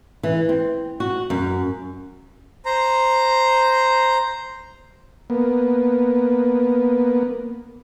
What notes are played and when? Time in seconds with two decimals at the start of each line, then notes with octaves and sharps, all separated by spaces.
0.23 E3
0.49 C4
1.00 F#4
1.30 F#2
2.65 C5 A#5
5.30 A#3 B3